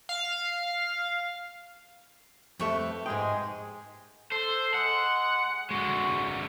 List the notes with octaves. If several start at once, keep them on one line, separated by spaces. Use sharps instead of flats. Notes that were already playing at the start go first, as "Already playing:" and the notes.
F5
F2 A3 G4 B4 C#6
G#2 G#3 G#4 G5
A4 C5
G#3 F#5
D3 G#3 F#4